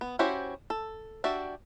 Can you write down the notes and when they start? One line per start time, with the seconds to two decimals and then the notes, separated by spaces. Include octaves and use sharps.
0.01 B3
0.19 C#4 E4 F#4 G4 C5
0.70 A4
1.24 D4 F#4 G4 D5 E5